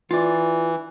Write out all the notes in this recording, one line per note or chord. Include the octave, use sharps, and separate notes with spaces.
E3 F4 D5